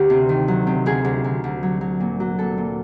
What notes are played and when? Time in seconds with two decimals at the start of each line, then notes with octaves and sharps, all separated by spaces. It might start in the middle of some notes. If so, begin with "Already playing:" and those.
Already playing: D2 G4
0.10 C3
0.29 D#3
0.48 F#3
0.67 C3
0.86 D2 G#4
1.05 D2
1.24 D2
1.44 D2
1.63 F#3
1.81 F#3
2.00 A#2
2.20 F#3
2.39 A#2 A4
2.58 A#2